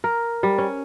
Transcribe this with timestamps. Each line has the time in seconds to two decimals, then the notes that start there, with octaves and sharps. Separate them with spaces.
0.04 A#4
0.43 G3
0.58 C#4